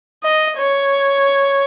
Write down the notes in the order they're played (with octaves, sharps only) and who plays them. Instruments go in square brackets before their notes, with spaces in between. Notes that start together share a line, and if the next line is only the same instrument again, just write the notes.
[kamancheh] D#5
C#5